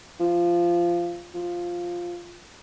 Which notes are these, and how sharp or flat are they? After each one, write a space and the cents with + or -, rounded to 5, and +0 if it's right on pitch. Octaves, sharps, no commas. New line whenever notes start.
F3 -15
F3 +0